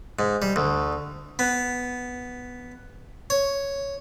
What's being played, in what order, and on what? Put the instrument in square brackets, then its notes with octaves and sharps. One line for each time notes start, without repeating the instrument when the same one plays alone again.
[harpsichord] G#2
G3
D2
B3
C#5